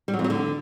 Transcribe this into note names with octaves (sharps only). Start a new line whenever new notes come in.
G3
F#3
F2
F#3
D3